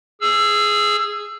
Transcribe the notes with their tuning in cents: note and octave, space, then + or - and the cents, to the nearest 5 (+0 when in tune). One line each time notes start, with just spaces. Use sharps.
G#4 +0 E6 +20